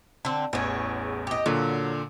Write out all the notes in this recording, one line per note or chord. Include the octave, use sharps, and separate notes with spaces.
D3 C4
A1 E2 G#4 C#5
G4 D#5
A#2 D3 F#3